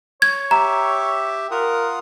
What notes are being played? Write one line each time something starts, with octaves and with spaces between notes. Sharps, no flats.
C#5 G#6
G4 E5 A#5
F4 A#4 F#5 D#6